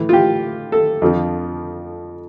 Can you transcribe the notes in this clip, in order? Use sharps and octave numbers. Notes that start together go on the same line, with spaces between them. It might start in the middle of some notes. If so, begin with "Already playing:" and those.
Already playing: A2 E3
F4
G4
A4
F2 D3 F3